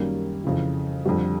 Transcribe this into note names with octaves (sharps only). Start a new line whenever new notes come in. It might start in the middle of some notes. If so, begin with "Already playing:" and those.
Already playing: F#2 D#3 G3 A#3 C#4
F2 C#3 E3
F2 D3 G3